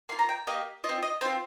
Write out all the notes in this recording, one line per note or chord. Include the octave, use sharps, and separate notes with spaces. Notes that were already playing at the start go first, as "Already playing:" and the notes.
A#3 F4 C6
A#5
G5
A#3 G4 D#5
F4 D#5
C4
D#5
C4 F4 C5